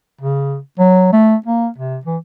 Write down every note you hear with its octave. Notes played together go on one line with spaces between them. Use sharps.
C#3
F#3
A3
A#3
C3
E3